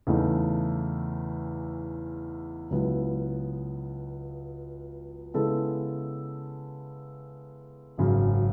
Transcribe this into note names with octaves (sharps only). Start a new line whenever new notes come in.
E2 C#3 E3 A3 D#4
C#2 C#3 F#3 B3 E4
C#3 G#3 B3 E4 A4
G#1 F#2 C#3 F#3